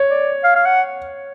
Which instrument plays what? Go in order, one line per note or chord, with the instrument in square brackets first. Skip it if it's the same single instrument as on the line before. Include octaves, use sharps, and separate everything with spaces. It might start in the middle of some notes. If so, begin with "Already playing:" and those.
Already playing: [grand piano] C#5
[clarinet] D5
F5
F5
F#5